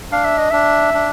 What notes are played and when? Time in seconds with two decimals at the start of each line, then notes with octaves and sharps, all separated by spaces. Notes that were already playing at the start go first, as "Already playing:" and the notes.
0.12 D4 F5
0.25 E5
0.38 D#5
0.51 D4 E5
0.94 D4